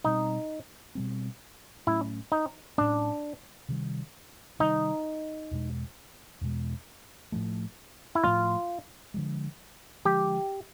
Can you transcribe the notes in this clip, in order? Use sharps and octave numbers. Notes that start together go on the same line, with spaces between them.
B2 G3 C4 D#4
B2 G3 C4
A2 F#3 A3 C#4 E4
D#4
A2 F#3 A3 C#4 D4
C3 D#3 G3
C3 D#3 G3 D#4
E2 B2 G#3
E2 B2 G#3
A2 F3 A3
E4
A2 F3 A3 F4
D3 F3 G#3
D3 F3 G#3 G4